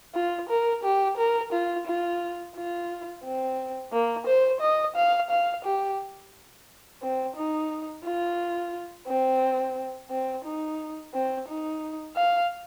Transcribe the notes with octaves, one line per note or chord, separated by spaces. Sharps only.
F4
A#4
G4
A#4
F4
F4
F4
C4
A#3
C5
D#5
F5
F5
G4
C4
D#4
F4
C4
C4
D#4
C4
D#4
F5